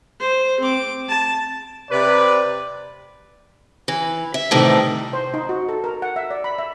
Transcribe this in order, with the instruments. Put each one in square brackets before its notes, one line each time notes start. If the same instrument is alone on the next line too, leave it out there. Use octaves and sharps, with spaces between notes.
[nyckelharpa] C5
C4 D6
A5
[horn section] C3 B4 [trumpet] D5
[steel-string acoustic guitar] E3
E5
A2 C3 D#3 E3 G3 A3
[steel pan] C5
D#4
F#4
A4
A#4
F#5
E5
D5
B5
E5